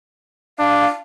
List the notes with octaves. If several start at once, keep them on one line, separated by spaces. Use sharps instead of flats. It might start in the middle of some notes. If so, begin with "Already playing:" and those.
D4 F5